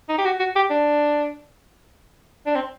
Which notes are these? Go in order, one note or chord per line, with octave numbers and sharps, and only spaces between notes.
D#4
G4
F#4
F#4
G4
D4
D4
C4